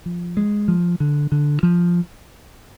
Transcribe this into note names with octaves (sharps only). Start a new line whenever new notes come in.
F3
G#3
F3
D3
D3
F3